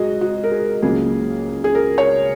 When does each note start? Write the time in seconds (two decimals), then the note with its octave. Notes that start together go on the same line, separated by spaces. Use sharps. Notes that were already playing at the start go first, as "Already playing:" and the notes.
Already playing: G#2 F#3 F#4 G#4 D#5
0.21 F#4
0.44 A#4
0.52 G#4
0.82 C#2 C#3 F#3 A#3 G#4
1.64 G#4
1.75 A#4
1.98 C#5